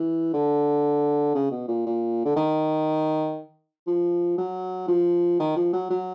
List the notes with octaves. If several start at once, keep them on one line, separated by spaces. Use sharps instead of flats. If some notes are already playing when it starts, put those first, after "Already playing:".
Already playing: E3
D3
C#3
B2
A#2
A#2
D3
D#3
F3
F#3
F3
D#3
F3
F#3
F#3